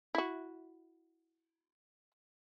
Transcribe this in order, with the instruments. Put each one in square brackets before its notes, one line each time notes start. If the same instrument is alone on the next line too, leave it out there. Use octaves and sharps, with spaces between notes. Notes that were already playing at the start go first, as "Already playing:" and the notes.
[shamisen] E4 F#4